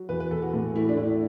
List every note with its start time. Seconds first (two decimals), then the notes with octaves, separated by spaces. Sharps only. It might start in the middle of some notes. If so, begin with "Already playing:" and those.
Already playing: F#3
0.09 E2 B4
0.20 B4
0.31 E2 A4
0.42 F#4
0.54 A2
0.76 A3 E4
0.89 D4
0.97 A2 E4